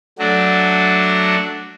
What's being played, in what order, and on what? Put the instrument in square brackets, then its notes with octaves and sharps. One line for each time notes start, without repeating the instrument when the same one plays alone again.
[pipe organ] F#3 A3 D4 F#4